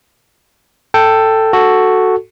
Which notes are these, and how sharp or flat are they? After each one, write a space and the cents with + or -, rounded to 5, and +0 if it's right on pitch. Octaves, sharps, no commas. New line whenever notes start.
A4 +10 G5 +0
F#4 +0 A4 +0